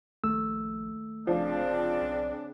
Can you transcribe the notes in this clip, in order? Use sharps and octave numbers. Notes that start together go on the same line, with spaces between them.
A#1 D#2 A3 E6
F1 C#3 F3 C4 D4
B1